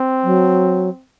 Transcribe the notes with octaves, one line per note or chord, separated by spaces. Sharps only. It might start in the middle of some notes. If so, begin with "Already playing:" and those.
Already playing: C4
F#3